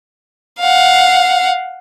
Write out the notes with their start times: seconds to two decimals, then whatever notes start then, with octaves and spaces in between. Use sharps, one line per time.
0.59 F5 F#5